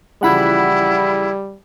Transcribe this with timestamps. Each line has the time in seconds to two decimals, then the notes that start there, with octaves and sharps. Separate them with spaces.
0.23 C#3 E3 F3 G3 E4 F#5 B5